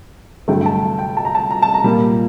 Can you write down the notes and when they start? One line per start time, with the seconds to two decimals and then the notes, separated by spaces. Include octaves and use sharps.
0.48 G2 D3 F#3 A3 G5
0.61 G5
0.66 A5
0.82 A5
0.99 G5
1.17 A5
1.25 A#5
1.35 A5
1.51 A#5
1.62 A5
1.74 A#5
1.84 A#2 G3 A#3